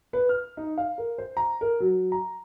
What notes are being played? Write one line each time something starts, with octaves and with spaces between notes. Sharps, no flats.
B4
F6
D#4
F5
A#4
C5
A#5
A#4
F#3
A#5